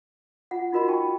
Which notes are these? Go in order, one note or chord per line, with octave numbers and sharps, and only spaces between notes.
F4 F#5
D#4 F4 F#4 A#4 D#5 B5
D#4 G5 A5 C#6